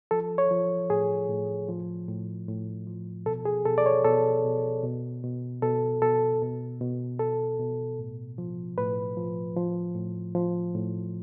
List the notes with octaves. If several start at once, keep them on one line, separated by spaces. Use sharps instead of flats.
F3 A4
C#5
F3
A2 G#4
A2
F3
A2
A2
F3
B2 A4
G#4
B2 A4
D5
C#5
B2 A4
B2
B2
B2
B2 A4
B2 A4
B2
B2
B2 A4
B2
A2
F3
A2 B4
F3
F3
A2
F3
A2